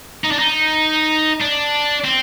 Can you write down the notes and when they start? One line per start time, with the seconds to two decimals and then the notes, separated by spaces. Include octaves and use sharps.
0.24 D#4
0.31 D4
0.39 D#4
1.41 D4
2.04 C4